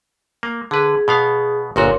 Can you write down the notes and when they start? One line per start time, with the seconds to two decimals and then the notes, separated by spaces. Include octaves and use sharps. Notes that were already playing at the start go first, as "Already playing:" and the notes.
0.43 A#3
0.71 D3 G#4 B4
1.08 B2 B3 F5
1.76 G1 A#2 F#4 A#4 C#5 C6